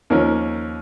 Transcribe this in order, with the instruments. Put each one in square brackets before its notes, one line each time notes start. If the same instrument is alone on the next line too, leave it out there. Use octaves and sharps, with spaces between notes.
[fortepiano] D#2 F3 C#4 A#4